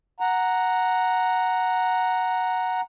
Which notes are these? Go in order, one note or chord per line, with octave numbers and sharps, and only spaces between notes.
F#5 A#5